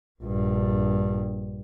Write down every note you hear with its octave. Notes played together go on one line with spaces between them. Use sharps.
A#1 G2